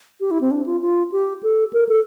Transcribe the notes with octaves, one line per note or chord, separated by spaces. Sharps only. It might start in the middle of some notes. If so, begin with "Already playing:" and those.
G4
E4
C4
D4
F4
F4
G4
A4
A#4
A4